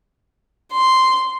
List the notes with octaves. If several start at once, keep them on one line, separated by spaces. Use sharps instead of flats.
C6